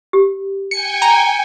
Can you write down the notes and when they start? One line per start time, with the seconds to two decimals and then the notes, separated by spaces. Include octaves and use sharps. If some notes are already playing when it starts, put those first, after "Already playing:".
0.13 G4
0.71 G5 G#5 C#7
1.02 A#5